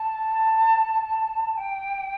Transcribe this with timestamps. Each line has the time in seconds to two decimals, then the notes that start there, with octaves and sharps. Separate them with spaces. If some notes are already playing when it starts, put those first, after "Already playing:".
Already playing: A5
1.57 G5